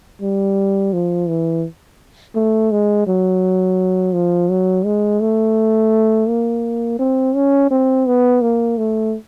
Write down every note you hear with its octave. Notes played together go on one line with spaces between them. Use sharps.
G3
F3
E3
A3
G#3
F#3
F3
F#3
G#3
A3
A#3
C4
C#4
C4
B3
A#3
A3